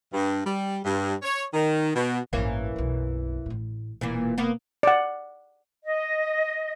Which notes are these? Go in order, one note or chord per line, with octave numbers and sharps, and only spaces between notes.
G2
G3
G2
C#5
D#3
B2
A1 G2 E3 A#3 C#4
B1 F#2
A1 A2
E1 A#2 E3 A#3
A#3 B3
D5 F#5
D#5